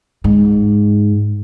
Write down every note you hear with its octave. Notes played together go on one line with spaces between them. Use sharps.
G#2